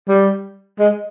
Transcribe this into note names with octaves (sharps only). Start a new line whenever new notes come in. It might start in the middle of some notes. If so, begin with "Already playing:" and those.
G3
G#3